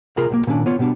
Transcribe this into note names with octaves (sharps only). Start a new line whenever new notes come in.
C3 F4 G#4 A#4 A#5 B5
B1 A2 A#3
A#2 D3 D#3 C#4 D4
B3 F4 C#5
B2 G3 B3 D4